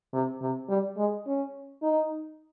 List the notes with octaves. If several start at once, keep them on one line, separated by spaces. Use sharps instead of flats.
C3
C3
G3
G#3
C#4
D#4